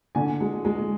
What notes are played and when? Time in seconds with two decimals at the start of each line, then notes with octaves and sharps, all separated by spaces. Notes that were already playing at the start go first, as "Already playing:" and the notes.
0.15 D3 G#5
0.41 G#3
0.65 G#3